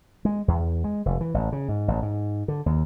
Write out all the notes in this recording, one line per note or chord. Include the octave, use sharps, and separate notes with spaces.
G#3
E2
G#3
F1
E3
A1
C#3
G#2
A1
G#2
D3
D#2